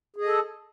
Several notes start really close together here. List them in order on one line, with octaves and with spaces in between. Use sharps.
G#4 D#5 A4